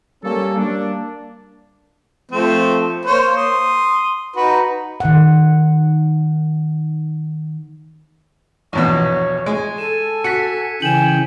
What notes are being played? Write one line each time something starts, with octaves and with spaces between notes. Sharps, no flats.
G3 A#3 C#4 A4
G3 A#3 D4
F3 A3 C4
A#3 C5 C#5
C6 D#6
D#4 F#4 B4
D#3 F#5
A#1 E2 B2 C#5
G#3 G#5
A4 D#7 E7
F#4 B6 C#7
C#3 E3 G5 G#5 E7 F#7